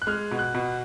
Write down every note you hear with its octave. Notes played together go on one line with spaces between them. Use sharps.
F#6
G#3 F6
B2
F#6
B2